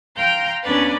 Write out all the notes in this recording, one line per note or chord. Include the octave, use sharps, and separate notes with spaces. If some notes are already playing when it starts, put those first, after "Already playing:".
F5 G5 A#5 C6 G6
D#2 B3 C#4 D4 B4 D5